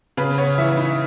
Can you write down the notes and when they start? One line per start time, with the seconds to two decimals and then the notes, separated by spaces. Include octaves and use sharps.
0.17 C#3 B4
0.38 B3 C#5
0.58 E3 E5
0.77 D#4